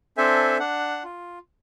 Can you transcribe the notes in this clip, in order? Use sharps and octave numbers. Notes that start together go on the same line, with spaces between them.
C4 D4 A4 C5 E5 G#5
D4 F#5
F4